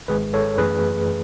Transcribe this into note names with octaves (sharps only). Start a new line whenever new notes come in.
G#1 G#2 G#3 G#4 B4
A4 C#5
F#2 E3 A3 G#4 B4